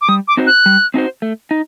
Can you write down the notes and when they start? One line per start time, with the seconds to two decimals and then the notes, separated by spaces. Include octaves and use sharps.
0.01 D6
0.09 G3 D#6
0.28 D6
0.37 C4 D#4 F#4 C5
0.47 F#6
0.66 G3
0.94 C4 D#4 F#4 C5
1.22 A3
1.51 D#4